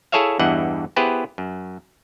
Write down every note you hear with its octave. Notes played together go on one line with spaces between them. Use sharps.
E4 G#4 A4 C#5 E5 F5
E2 G2 E3 D#5 F#5
B3 E4 G4 G#4 B4 C5
F#2